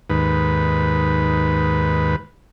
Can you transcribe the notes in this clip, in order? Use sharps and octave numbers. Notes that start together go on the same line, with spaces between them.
D#2 G#2 B4